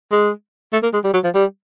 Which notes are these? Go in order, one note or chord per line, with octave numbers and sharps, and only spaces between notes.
G#3
A3
A#3
G#3
G3
F#3
F3
G3